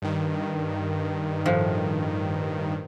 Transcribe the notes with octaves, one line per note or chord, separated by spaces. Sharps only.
G2 D#3
A2 F3